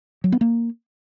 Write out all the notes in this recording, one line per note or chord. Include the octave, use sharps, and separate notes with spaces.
F#3
B3
A#3